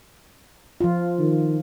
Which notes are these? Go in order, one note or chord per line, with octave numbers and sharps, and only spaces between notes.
F3 F4
D#3